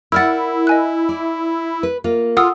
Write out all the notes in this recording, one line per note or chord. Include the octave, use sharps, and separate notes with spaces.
E4 A#4 D5 F#5 E6 F6 A6
D#5 G#5 F#6
D5
B4
A#3 F4
F4 A4 F#5 D#6 E6